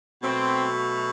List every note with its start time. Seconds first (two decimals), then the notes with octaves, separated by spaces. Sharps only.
0.22 B2 F#3 A3 C4